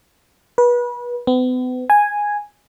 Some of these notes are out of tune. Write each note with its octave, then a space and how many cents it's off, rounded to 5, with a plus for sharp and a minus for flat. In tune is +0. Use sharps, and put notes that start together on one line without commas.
B4 -30
B3 +40
G#5 -5